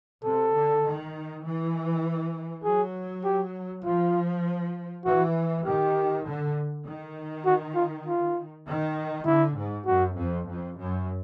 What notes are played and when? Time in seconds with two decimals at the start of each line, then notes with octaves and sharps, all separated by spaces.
0.23 C3 A4
0.54 D3
0.84 D#3
1.44 E3
2.64 F#3 G#4
3.24 G4
3.84 F3 F4
5.05 E3 F#4
5.66 D#3 G4
6.25 D3
6.85 D#3
7.46 F#4
7.75 F4
8.06 F4
8.67 D#3
9.26 D3 E4
9.56 G#2
9.86 F#2 F#4
10.16 F2
10.47 F2
10.77 F#2